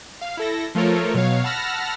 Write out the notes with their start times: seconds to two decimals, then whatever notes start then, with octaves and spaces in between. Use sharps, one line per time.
0.21 F5
0.37 E4 A4 A#6
0.75 F3 A3 F4 A4 A#4 C#5
1.14 B2 F#3 C#5 F5
1.44 F#5 A5 B5 E6 F6 A#6